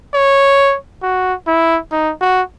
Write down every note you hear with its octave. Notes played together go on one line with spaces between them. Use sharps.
C#5
F#4
E4
D#4
F#4